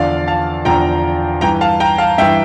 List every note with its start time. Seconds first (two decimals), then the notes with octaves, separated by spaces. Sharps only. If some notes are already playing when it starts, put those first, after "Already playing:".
Already playing: E2 D3 F3 D5 F5
0.28 F5 A5
0.65 E2 D3 F3 G5 A#5
1.41 G2 E3 G5 A#5
1.61 F5 A5
1.80 G5 A#5
1.98 F5 A5
2.18 G2 E5 G5
2.22 E3